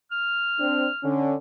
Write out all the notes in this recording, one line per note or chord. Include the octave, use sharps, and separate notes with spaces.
F6
C4 D4
D3 C#4